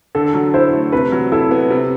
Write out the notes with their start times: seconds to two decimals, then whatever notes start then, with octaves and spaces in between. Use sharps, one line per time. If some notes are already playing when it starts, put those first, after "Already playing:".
0.15 D3 A4
0.34 F#3
0.54 E4 C5
0.73 A3
0.92 C3 B4
1.12 F#3
1.32 E4 A4
1.51 B3
1.70 C3